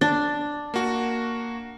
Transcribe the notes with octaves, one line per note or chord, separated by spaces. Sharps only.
D4 A6
A#3 F#4